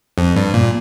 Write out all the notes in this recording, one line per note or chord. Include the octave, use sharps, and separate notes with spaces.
F2
G2
A#2